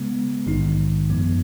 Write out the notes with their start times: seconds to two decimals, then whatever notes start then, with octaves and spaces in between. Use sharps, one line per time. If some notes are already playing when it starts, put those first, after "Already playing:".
Already playing: C#3 G#3 B3
0.46 A#1 G#2 D#3 G#3 D#4
1.10 F#2 F3 B3